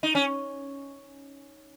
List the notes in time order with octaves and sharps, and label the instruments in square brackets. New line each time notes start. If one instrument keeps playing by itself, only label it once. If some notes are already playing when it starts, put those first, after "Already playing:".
[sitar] D#4
C#4